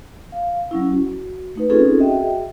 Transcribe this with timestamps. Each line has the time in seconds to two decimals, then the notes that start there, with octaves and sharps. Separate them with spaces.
0.32 F5
0.71 F#3 C#4 E4
0.92 F#4
1.55 A3 D#4 B4
1.70 C4 C#4 D#4 F4 G#4 A4
1.99 F#4 G#4 D#5 E5 G5